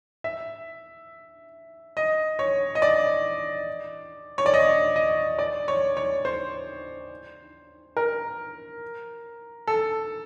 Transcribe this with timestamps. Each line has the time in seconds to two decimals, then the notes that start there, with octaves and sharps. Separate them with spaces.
0.24 E5
1.97 D#5
2.39 C#5
2.75 D#5
2.82 D5
4.38 C#5
4.46 D5
4.54 D#5
4.96 D#5
5.39 D5
5.68 C#5
5.97 C#5
6.25 C5
7.97 A#4
9.68 A4